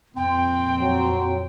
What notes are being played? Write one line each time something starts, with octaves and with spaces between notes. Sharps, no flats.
F2 A#2 C4 G5
F#3